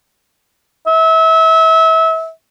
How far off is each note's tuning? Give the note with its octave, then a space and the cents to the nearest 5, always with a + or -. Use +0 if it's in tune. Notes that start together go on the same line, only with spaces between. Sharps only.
E5 -30